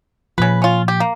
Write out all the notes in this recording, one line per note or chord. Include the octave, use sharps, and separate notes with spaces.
A#2 C#3 F3 B4
C#4 F4
G4
A#3